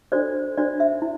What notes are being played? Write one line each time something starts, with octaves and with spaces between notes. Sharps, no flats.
D4 F#4 A4 C5 D5
D4 F#4 C5 D5
E5
E4